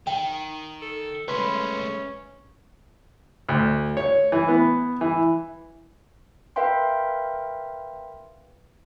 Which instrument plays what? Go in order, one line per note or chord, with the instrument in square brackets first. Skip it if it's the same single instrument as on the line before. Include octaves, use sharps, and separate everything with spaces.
[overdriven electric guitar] D#3 [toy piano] G5
[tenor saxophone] A4
[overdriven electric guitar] G#3 A3 [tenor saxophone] C#4 [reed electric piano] B4 B5 C6
[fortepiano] D2
C#5
E3
B3
E3
[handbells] A#4 B4 E5 F5 G5 C6